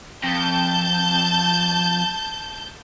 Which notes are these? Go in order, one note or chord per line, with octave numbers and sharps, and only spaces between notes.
F2 A5 G6